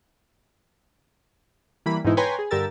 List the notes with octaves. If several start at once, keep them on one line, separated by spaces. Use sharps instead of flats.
E3 G3 A#3 B5
G#2 B2 E3 G#3 D#4 E4
B4 C#5 G5 G#5 A#5 C6
G#4
G2 D3 G4 A#4 E6 A6